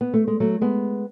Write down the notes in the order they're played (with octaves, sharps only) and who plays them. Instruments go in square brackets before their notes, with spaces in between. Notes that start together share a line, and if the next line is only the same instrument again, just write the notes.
[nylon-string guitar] B3
A3
G#3
F#3 A3
G#3 B3